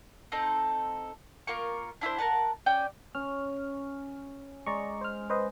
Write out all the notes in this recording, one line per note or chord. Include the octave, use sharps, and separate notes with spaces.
C4 D#4 A4
A#3 F4 A#4 C#6
D4 E4 A4 C5
A#4 B4 F#5 A5
C#4 D5 G5
C#4 F6
G#3 D5 A#5 C#6
C5 F6
B4 C5 D#5